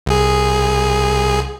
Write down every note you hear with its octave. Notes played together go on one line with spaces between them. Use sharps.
C2 G#4